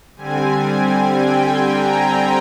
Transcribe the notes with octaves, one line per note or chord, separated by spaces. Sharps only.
D3 G3 C4 G#5
G5
A#5